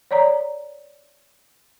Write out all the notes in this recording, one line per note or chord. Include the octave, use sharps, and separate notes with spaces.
C#5 D5 A#5